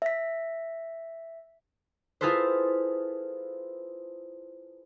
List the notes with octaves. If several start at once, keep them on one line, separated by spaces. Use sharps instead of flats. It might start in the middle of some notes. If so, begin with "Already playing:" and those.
E5 B6
E4 F4 G#4 A4 B4 C5